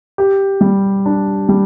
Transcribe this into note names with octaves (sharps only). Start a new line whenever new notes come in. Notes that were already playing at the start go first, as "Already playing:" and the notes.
G4
G3
D4
G3